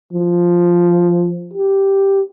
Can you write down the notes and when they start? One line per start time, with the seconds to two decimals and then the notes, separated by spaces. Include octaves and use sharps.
0.13 F3
1.54 G4